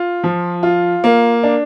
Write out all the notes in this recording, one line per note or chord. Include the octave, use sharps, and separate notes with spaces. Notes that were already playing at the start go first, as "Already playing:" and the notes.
Already playing: F4
F3
F4
A#3
D4